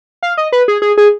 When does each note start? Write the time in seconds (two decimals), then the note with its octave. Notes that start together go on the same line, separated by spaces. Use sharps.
0.23 F5
0.37 D#5
0.52 B4
0.68 G#4
0.82 G#4
0.98 G#4